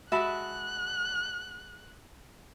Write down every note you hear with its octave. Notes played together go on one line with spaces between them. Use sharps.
G#3 F#4 E5 A5 B5 F#6